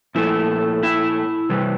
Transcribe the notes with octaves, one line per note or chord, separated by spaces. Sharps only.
A#2 F3 A3 E4
E4
C3 E3 G3